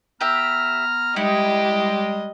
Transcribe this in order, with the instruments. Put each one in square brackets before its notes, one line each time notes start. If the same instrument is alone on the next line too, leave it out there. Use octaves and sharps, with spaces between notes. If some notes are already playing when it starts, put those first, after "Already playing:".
[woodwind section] B3 A#5 F6 [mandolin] G4 E5
[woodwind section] G3 G#3 [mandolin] D#4 E4 [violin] G4 [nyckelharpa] D#5